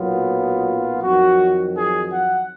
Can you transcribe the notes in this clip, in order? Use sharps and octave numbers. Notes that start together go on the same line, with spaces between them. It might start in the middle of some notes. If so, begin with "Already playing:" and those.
Already playing: B1 A#2 F#3 B3 F4
F2 D#3 F#3 F#4
G#4
F#5